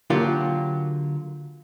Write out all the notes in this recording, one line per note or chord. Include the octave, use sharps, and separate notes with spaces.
D3 F#3 A#3 F4 G4